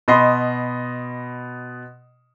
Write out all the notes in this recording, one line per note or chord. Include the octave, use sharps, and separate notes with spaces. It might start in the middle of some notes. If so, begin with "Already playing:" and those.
B2 D#5 B5 C6